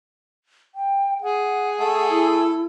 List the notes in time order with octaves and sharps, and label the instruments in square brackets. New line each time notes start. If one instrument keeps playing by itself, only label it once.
[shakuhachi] G5
[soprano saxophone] G#4 [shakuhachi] F#5
[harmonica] A3 A4
[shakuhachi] E4